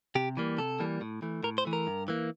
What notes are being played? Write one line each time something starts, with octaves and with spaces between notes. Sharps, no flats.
C3 G4
E3 G3 A#3
C3 A4
E3 G3 A#3
A2
E3 A3
A2 A#4
C5
E3 A3
A#4
G2
E3 A#3